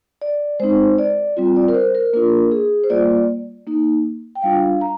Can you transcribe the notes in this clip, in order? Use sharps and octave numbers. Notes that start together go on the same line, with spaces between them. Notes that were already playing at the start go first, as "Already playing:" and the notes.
D5
G#3 C4 D#4 C5
D5
G3 C4 F4
D5
A#4
C5
A#4
A#3 D4 F4 A#4
G#4
C5
G3 A#3 F4 D5
A#3 D#4
G5
G3 D4 F4 F5
A#5